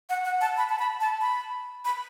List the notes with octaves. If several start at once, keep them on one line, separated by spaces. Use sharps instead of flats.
F#5
F#5
A5
B5
A5
B5
A5
B5
B5